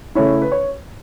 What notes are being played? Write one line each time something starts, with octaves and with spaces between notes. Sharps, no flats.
C#3 A3 C#4 E4 C#5
B4
C#5